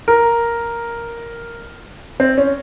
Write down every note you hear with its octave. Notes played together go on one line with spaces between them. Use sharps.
A#4
C4
C#4